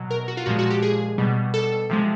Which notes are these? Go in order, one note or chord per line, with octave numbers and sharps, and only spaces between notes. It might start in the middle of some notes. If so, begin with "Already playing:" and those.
Already playing: B2 F#3
A#4
F#4
F4
A#2 F3 G#3 F#4
F#4
G4
G#4
B2 G3
A4
C3 F3 G#3